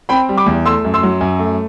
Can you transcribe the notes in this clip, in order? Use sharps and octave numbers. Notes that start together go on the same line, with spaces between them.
C4 G5 B5
G3
B5 D6
E2
A3 C6 E6
F#2
C6 E6
F#3
F#2
A3